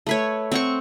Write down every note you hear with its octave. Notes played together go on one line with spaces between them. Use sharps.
A3 B4 C#5
C4 F#5 C#6